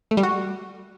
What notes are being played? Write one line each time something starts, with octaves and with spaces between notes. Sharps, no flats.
A3
G3
F#4